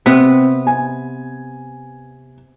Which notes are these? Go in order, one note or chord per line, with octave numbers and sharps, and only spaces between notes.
C3 B3 C4 B4
G#5